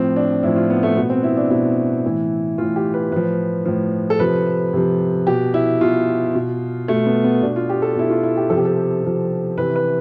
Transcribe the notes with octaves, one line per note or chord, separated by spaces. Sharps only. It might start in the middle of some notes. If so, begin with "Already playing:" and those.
Already playing: A2 F3 C4
D4
A2 F3 E4
F4
B3
A3
B2 B3
C4
E4
D4
B2 E4
A2 E3
A2 E3 F4
G4
B4
A2 F3 B4
A2 F3
A4
C3 F3 B4
C3 F3
B2 G4
E4
B2 F4
B2
B2 A3
B3
B3
B2 D4
F4
G4
A4
B2 E4
F4
E4
G4
C3 F3 A4
G4
A4
C3 F3
C3 E3 B4
B4